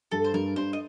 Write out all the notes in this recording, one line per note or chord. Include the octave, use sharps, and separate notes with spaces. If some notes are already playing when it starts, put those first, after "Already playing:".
G2 A4
C5
G2 A#4
G2 C5
D#5